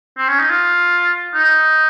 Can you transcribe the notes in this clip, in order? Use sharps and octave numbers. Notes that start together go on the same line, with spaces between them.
C4
C#4
D#4
F4
D#4